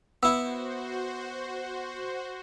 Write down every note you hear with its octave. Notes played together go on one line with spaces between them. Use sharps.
B3 E4 F#4 C5 E6